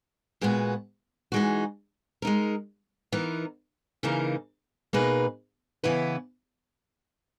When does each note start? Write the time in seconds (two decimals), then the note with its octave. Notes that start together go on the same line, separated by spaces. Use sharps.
0.41 A#2 G#3 B3 F#4
1.32 E3 G#3 D#4 F#4
2.22 G#3 D#4 A#4
3.12 E3 B3 D#4 A#4
4.03 C#3 E3 A#3 D#4 A#4
4.93 B2 A#3 D#4 G#4 B4
5.84 C#3 E3 B3 E4 B4